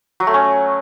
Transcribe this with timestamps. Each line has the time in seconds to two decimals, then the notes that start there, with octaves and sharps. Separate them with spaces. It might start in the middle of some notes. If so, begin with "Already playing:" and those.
0.20 F#3
0.27 A3
0.34 C#4